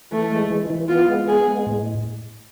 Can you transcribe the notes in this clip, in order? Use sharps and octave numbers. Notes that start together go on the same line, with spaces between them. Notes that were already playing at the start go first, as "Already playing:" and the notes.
E3 A3
G#3
E3
E3
B3 F4
G#3
B3 G#4
G#3
A2